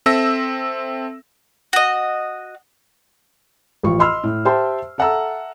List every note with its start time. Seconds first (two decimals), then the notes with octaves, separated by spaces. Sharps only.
0.06 C4 A4 E5 E6 A#6
1.73 F#4 D#5
3.83 A1 F3 F4 C#6
3.99 D#5 B5 C6 E6 F6
4.23 A2
4.45 G4 C5 E5 G5 A5 C6
4.98 A4 E5 F#5 A5 A#5 E6